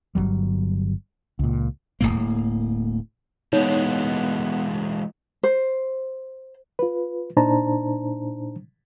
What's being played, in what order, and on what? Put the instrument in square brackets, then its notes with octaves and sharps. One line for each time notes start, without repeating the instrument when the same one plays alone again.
[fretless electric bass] G1 F2 F#3 G3
C#2 A#2
[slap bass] D1 G#1 A2 A#3
[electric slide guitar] E3 G#3 A#3 [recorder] B3 [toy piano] D#4 C#5
[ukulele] C5
[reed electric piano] F4 B4
A#2 D4 D#4 C5 A5 A#5